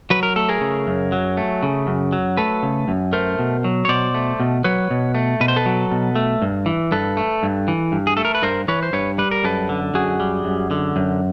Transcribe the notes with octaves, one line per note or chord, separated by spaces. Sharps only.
F#3 B4
A#4
A3 A4
G#4 A#4
C#3
F#2
F#3
A3
C#3
F#2
F#3
A3 A4 B4
C#3
F#2
A3 A#4 C5
B2
F#3
C#5
B2 C5 D5
A3
B2
F#3 B4 C#5
B2
A3
B2 B4
C5
A4 B4
F#3
B2
A3
G2
E3
G2 A4 B4
A3
G2
E3
G2
G#4
A3 A4
A#4
B4
G2 A#4 C5
E3 B4 C#5
C5
G2 B4 C#5
G3 B4
A#4
F#2 A4 B4
D3
F#2 F#4 G#4
G3
F#2
D3
F#2